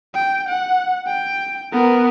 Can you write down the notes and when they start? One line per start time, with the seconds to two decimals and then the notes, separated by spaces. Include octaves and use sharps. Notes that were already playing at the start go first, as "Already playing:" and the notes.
0.14 G5
0.49 F#5
1.07 G5
1.72 B3 A#4